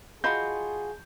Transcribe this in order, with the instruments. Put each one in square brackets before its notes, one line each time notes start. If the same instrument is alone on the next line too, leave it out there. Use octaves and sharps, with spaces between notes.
[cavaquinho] F4 F#4 [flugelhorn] G#4 [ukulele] D#5 A5 B5 [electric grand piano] G6